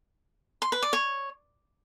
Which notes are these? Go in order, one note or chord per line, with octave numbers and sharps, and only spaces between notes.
C6
B4
D5
C#5